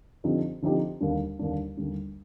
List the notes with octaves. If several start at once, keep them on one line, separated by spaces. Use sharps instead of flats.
D3 F3 C4 D#4 G4
D3 F3 C4 D#4 G4
D#2 D3 G3 D4
D#2 D3 G3 D4
D#2 D3 G3 D4